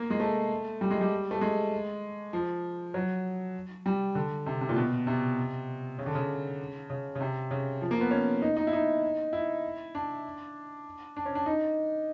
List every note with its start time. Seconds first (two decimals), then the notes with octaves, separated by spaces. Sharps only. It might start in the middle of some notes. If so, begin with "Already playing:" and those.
Already playing: A#3
0.10 G#3
0.20 A3
0.81 G3
0.91 G#3
1.01 G3
1.31 A3
1.41 G#3
2.33 F3
2.94 F#3
3.86 G3
4.15 D3
4.46 C3
4.61 C3
4.69 A#2
4.76 B2
5.07 C3
5.99 C#3
6.06 D3
6.15 C#3
6.90 C#3
7.15 C#3
7.20 C3
7.51 C#3
7.81 F3
7.91 A#3
8.01 B3
8.11 C#4
8.42 D#4
8.57 D#4
8.67 E4
8.73 D#4
9.33 E4
9.95 D4
11.16 D4
11.26 C#4
11.35 D4
11.46 D#4